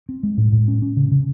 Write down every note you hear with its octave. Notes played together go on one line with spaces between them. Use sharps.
C4
G#3
A2
A2
C#4
C#4
C#3
C#3